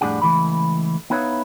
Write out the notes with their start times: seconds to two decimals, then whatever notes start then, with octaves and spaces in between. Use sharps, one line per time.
0.01 F2 A2 G3 D4 G#4 F#5
0.22 C#2 E3 A3 B5
1.10 B3 D#4 E4 B4 C#5 F5